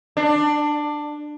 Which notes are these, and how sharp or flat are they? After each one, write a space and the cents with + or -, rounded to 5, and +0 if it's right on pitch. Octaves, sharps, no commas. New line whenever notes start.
D4 +15